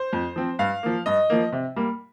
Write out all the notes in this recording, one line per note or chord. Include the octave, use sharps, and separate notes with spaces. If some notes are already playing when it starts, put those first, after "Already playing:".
Already playing: C5
F2
F3 C4
G2 F5
F3 A#3
G2 D#5
F3 A#3
C3
G3 A#3